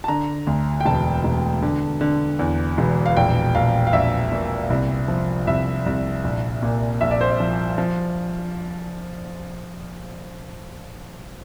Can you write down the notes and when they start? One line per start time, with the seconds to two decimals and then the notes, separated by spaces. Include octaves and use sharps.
0.04 A5
0.08 D3 A#5
0.47 D2
0.81 G5
0.85 E1 A5
1.24 E1
1.62 D3
2.01 D3
2.39 E2
2.78 E1
3.06 F5
3.16 A#1 G5
3.55 A#1 F5
3.87 F5
3.93 A#1 E5
4.32 A#2
4.70 C2
5.08 F3
5.47 C2 E5
5.86 C2
6.24 A#1
6.63 A#2
7.01 A#1 E5
7.11 D5
7.21 C5
7.31 D5
7.40 F3
7.78 F3